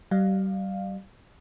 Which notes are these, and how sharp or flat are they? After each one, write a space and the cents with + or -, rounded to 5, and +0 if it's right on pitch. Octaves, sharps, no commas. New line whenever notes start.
G3 -35 D5 +45 F5 +5